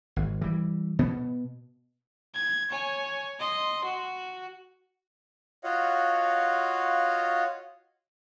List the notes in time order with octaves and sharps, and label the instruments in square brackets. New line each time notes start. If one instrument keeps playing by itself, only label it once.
[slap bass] G#1
E3 G3
B2 B3
[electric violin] G#6
C#5 G#5
D#5 C6
F#4
[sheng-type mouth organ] F4 F#4 C#5 D#5 F5 F#5